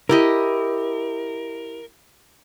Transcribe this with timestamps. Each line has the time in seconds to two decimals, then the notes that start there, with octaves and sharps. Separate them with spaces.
0.09 E4 G4 A#4 D#5